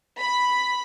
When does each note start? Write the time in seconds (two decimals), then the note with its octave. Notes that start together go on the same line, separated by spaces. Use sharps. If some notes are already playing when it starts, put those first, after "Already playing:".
0.20 B5